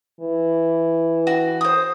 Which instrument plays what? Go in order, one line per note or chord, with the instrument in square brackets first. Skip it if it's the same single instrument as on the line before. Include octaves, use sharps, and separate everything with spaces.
[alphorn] E3
[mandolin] F#4
C5 D#6